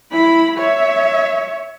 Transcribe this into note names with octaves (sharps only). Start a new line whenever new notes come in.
E4 B5
C#5 E5